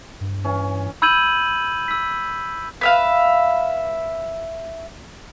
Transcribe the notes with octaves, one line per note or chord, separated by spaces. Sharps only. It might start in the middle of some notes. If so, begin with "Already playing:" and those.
G2
E3 C#4
B5 E6 G6 G#6 D#7 F#7
E6 B6
B4 E5 F5